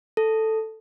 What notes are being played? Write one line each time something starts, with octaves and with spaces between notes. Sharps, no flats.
A4